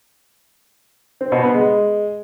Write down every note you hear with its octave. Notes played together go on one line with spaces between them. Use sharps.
C4
B2
B3
G#3